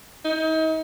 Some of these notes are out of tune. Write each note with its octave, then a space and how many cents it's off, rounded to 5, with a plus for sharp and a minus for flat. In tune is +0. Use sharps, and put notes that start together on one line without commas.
D#4 +35